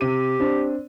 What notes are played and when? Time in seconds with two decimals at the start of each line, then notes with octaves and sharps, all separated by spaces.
0.01 C3 G4 D#7
0.40 C4 D4